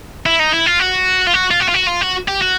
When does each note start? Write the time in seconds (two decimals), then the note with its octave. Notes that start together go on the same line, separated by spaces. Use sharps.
0.26 E4
0.39 D#4
0.53 E4
0.66 F4
0.80 F#4
1.27 F4
1.34 F#4
1.51 F4
1.61 F#4
1.69 F4
1.75 F#4
1.87 F4
2.02 F#4
2.28 G4
2.42 F#4